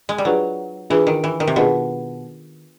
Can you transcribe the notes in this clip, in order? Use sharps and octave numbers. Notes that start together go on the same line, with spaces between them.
G#3
G3
F#3 D4 F4 G#4 B4
E3 D4 F4 G#4 B4
D#3
E3
D#3
C3
B2 D4 F4 G#4 B4